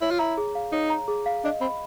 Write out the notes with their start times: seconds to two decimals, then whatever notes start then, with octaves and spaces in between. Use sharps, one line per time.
0.01 E4 C#5
0.11 F4
0.19 E4 A#5
0.37 G#4
0.55 F5
0.72 D#4 C#5
0.90 A#5
1.08 G#4
1.26 F5
1.44 D4 D#5
1.61 C4 B5